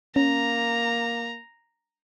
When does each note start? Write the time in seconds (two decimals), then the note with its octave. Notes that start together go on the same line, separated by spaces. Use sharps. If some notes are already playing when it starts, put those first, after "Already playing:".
0.16 A#3 C#4 A#5